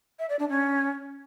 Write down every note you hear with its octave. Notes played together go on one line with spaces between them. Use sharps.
E5
D5
D4
C#4